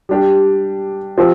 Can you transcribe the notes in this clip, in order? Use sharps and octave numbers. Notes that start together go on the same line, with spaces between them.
G3 D4 G4
F3 C4 G4